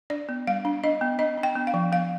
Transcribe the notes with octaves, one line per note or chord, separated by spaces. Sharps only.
D4 D5
B3
G3 F5
D4
D4 D#5
B3
D4 D#5
D4
G5
B3
F5
F3
B3 F5